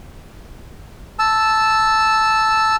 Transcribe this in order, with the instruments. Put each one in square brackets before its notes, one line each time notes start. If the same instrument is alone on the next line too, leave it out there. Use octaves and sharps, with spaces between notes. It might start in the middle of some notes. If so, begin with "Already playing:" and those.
[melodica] A5 E6